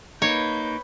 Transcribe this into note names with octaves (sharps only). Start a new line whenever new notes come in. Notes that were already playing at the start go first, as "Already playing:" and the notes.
A#3 D#4 B4 C#5 G6